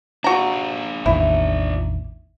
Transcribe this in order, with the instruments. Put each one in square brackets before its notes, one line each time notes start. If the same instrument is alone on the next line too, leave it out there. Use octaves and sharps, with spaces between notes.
[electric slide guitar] D4 F4 [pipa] F#4 A#5
[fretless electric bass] A1 E2 D#3 [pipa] E4